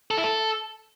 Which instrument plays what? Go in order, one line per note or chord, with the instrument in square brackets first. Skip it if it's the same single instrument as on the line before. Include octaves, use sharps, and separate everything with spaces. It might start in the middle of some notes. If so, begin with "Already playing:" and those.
[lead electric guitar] A4
E4
A4